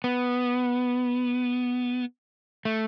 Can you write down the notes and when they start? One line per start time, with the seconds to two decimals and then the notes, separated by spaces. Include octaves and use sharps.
0.04 B3
2.65 A3